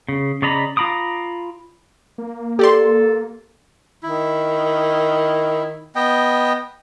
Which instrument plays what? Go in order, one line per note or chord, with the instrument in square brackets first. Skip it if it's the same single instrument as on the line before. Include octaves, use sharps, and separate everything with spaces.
[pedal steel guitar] C#3
C#3 D5 D#5 A#5 B5
F4 A#5 B5 D6 D#6
[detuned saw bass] A#3
[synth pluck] G4 D5 C6 [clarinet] A4
[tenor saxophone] D#3 [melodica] E4
[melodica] B3 D#5 G5